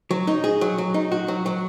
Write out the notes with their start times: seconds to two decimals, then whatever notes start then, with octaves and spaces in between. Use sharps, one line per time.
0.11 F#3
0.27 D#4
0.44 G#4
0.61 F#3
0.78 F#3
0.94 D#4
1.12 F#4
1.28 F#3
1.46 F#3